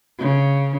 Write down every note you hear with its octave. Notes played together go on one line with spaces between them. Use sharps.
C#3